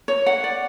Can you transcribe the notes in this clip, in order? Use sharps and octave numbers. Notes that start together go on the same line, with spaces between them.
C#5
F#5
D5